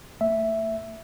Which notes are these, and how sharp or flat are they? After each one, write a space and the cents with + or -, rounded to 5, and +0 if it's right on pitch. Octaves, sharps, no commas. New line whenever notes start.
A3 +35 E5 +0